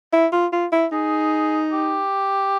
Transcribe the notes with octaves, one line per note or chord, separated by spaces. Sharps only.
E4
F4
F4
E4
D#4 G#4
G4